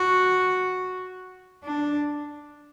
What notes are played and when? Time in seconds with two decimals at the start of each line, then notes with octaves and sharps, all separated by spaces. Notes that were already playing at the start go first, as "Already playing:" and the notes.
Already playing: F#4
1.64 D4